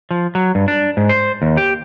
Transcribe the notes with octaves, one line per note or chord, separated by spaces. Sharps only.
F3
F#3
G2
D4
G#2
C5
D#2
G4